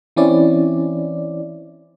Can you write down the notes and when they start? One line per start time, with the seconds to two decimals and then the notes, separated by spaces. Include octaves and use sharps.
0.16 E3 C4 C#4 E4 D5